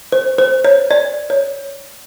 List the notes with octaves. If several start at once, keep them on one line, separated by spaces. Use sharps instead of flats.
C5
C5
C#5
D5
C#5